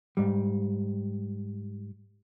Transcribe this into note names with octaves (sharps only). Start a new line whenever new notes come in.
G#2 G3